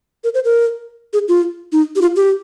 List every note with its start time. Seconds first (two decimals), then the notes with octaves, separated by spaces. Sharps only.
0.24 A#4
0.34 C5
0.45 A#4
1.13 G#4
1.28 F4
1.72 D#4
1.96 G4
2.01 F4
2.16 G4